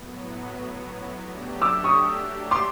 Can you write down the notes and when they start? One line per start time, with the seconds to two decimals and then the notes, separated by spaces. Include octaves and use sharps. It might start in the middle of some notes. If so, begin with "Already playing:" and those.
Already playing: A2 F#3 B3
1.18 F#3 A3 D4 G4
1.62 D6 E6
1.84 C#6 D#6
2.51 C6 D6